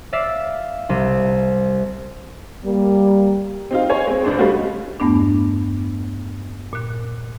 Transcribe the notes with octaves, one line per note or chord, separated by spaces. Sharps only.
D5 E5 F5
C2
G3 A#3
C4 D#4 F4
C5 C#5 G#5
G#3 C4
C#2 D4 C5
G3 A3 C#4 D#4 F4 F#4
E2 G2 A3 B3 D4
A#2 F#6